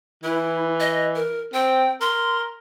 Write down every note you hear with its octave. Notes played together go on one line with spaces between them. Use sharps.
E3 E4
D#5
A#4
C4 G5
A#4 C6